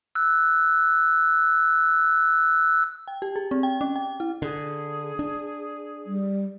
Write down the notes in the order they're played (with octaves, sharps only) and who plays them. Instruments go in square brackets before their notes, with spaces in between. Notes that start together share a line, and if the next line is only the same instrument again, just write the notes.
[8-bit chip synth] E6 F#6
[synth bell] G5
G4
G#4
C4
G5
C#4
G5
E4
[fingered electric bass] D3 [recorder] G#4
[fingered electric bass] D4
[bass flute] G3